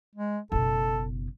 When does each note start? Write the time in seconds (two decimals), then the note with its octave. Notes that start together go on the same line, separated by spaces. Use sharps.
0.15 G#3
0.52 F#1 B2 A4